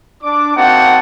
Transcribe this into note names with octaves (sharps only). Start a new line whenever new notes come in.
D4 D6
A#3 C4 D#4 F#4 F#5 A5